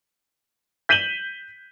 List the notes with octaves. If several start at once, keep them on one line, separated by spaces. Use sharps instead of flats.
G6 B6 D#7 E7 F#7 G7